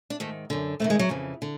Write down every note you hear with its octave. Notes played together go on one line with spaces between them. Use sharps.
D4
G#2 D#3 A3
F#2 D3
D2 C3 D#3 A3
G#3
F#3
F2 C#3 E3
D3